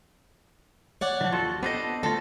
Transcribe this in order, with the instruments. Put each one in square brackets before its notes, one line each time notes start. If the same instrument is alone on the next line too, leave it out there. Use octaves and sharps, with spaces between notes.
[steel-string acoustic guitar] C#5 D5 F#5
[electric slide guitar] D#3 F3
[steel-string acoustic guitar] D#2 [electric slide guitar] F4 F#4 A4
[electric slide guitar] B3 C5 D#5 [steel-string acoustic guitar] C4 D4 A4
[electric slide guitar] D3 A3 F4 [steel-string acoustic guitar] C4 A4